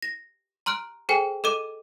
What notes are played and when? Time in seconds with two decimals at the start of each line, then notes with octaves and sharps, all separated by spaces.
0.03 A#6
0.66 A#5 C6 F6 F#6 D7
1.09 G#4 A4 C5 G5 G#5
1.44 A4 D#5 D6 D#7